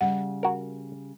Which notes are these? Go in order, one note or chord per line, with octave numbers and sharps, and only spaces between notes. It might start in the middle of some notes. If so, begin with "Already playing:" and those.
C#3 G3 F#5
F#4 A#4